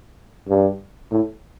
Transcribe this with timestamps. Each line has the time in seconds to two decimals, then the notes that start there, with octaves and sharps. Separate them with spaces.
0.48 G2
1.11 A2